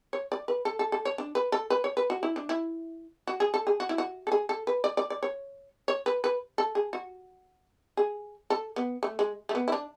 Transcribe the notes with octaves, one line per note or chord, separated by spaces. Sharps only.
C#5
D5
B4
A4
A4
A4
C#5
D4
B4
A4
B4
C#5
B4
F#4
E4
D4
E4
F#4
G#4
A4
G#4
F#4
E4
F#4
A4
G#4
A4
B4
D5
D5
D5
C#5
C#5
B4
B4
A4
G#4
F#4
G#4
A4
B3
A3
G#3
A3
B3
E4
D4